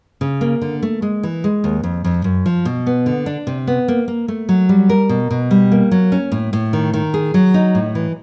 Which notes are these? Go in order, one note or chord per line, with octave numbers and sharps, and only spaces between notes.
C#3
A#3
D3
A3
G#3
E3
G#3
D#2
F2
F2
F#2
F3
B2
B3
D3
D4
C3
B3
A#3
A#3
A3
F#3
G3
A#4
B2
B2
G3
A#3
F#3
C#4
A2
A2
D#3
D#3
G#4
F#3
D#4
A2
E3